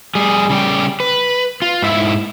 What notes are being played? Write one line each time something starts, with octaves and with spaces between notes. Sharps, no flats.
G3 G#4
C#3 G3 G4
B4
F4
G#2 E4 E5